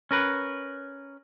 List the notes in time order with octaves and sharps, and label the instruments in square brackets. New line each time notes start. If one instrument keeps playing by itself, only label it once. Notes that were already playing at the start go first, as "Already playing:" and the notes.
[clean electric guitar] C#4 A#4 B4